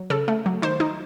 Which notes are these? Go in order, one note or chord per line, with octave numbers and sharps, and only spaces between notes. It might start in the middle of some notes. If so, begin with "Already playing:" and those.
Already playing: F#3
C#3 A4
A3
F#3
D#3 C5
D#4